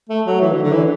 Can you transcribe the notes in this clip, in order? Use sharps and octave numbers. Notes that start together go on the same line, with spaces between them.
A3
F#3
E3
D3
D3
E3